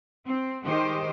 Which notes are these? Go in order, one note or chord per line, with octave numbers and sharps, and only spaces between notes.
C4
D#3 G#3 G4 C5 D#5